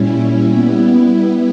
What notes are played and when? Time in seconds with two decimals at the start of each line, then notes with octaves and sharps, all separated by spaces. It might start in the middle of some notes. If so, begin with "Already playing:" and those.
Already playing: A#2 G3 C#4 E4
0.49 G3 B3 E4